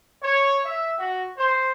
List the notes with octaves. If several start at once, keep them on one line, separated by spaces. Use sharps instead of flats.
C#5
E5
F#4
C5